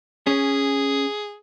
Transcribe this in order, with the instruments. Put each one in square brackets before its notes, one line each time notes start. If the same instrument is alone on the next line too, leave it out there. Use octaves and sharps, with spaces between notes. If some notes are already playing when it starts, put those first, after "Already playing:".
[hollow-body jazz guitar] C#4 [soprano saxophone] G#4